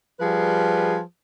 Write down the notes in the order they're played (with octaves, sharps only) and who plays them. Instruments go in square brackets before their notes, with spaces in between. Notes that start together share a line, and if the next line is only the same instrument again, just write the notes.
[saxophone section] F3 G3 G#4 B4